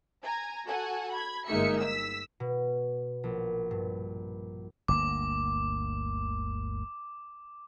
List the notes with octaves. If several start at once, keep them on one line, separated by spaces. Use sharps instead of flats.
G#5 A#5
F#4 A4 F#5 G#5
B5 G#6
G1 G#3 A#3 D#4 E5 C#7
E6 B6
B2
A#1
G2
G1 D2 A#3 D6